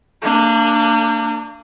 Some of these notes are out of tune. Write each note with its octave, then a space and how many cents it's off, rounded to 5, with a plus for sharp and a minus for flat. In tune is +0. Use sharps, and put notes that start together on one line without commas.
A#3 -35 D4 +0